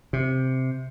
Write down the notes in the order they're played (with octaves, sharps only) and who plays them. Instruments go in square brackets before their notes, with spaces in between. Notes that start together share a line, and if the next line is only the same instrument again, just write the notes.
[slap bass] C3